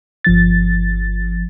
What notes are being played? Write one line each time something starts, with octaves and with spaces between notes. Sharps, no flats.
G1 F3 A6